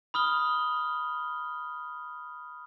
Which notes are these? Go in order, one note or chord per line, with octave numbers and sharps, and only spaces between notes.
B5 D#6 F6 G7